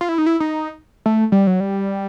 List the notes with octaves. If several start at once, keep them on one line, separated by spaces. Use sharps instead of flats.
F4
E4
D#4
E4
D#4
A3
G3
F#3
G3